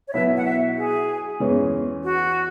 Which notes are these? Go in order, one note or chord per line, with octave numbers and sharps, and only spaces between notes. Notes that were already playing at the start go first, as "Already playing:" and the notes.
C#5
B2 F#3 E4 B4 E5
F#5
E5
G#4
E2 E3 G#3 C#4
F#4